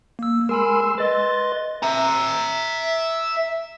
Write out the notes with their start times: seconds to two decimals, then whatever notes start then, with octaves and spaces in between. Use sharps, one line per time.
0.19 A#3 E6
0.49 G#3 A#4 G#5 B5 C6 E6
0.98 B4 D#5 C6 A6
1.83 E5 A#5